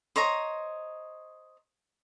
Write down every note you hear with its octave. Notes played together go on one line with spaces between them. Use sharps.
C5 C#5 D#5 A#5